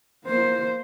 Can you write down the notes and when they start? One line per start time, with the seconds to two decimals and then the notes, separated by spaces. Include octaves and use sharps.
0.24 A#3 C5